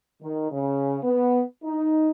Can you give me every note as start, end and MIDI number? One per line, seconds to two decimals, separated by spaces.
0.22 0.49 51
0.51 0.97 49
1.03 1.41 59
1.64 2.11 63